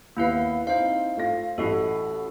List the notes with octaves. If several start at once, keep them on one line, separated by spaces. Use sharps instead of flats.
D#2 A#3 B3 E4 B4 F5
C4 D#4 E4 C5 F5
A3 F4 A#6
A1 E4 F#4 A4 D#5 C7